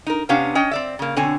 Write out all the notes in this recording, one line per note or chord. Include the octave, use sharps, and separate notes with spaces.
D#4 A#4
C3 B3 C#4 D4 G4 F5
C#4 D#5 G5
C4 D5 E5
C#3 A#3
B2 D3 C4 C#5 G#5